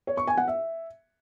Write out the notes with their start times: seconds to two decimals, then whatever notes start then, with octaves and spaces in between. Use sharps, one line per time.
0.07 C#5
0.17 C#6
0.27 G#5
0.37 F#5
0.48 E5